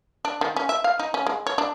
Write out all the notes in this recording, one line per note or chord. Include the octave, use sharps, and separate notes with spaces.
D4
D#3
C#4
E5
F5
D#4
C#4
G#3
C#5
D4